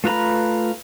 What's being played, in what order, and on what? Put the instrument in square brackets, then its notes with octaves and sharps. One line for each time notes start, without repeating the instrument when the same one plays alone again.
[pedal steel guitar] A3 F4 B4 A#5 B5